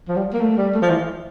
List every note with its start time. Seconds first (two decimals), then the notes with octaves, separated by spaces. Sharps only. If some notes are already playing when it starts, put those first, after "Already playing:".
0.08 F3
0.17 G3
0.33 A#3
0.41 A3
0.57 G3
0.74 A3
0.82 F3
0.90 E3